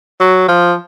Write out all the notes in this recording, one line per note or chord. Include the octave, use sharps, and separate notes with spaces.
F#3
F3